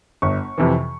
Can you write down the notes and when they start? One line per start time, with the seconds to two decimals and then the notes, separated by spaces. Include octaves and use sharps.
0.22 G1 C#6
0.58 F2 C3 E3